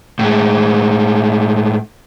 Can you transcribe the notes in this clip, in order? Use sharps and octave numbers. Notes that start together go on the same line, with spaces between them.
A2 G#3